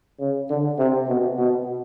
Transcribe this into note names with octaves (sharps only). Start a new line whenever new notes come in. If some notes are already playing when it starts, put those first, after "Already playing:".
C#3
D3
C3
B2
B2